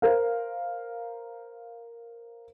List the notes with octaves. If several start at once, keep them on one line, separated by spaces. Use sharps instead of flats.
A#4 C5 F5